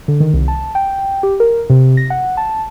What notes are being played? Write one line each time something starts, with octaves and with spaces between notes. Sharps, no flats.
D3
D#3
C2
A5
G5
G4
A#4
C3
A#6
F#5
A5